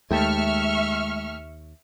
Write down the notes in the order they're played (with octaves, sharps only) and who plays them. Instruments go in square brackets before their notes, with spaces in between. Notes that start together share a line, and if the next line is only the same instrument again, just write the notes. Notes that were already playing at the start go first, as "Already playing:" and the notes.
[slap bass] D#2 [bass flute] G#3 [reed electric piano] A3 G5 A5 [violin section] E5 C#6 F6